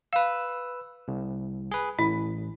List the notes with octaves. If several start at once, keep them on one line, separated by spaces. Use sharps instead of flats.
B4 F5 E6
C2
G#4 B4
A1 E4